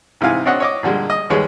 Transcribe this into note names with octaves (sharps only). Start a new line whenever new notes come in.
G#2 C3 E3 F5 G#5
C4 D4 F#4 C#5 D#5 F#5
C#5 D#5 D6
A#2 D3 G3 G#3
D#5
D#2 G3 G#3 G#4 B4 C#5